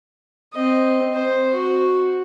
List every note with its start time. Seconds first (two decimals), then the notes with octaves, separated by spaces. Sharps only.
0.53 C4 D#5
1.14 C5
1.53 F#4